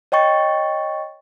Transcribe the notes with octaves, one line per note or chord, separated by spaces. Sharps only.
C#5 D#5 G5 C#6 A6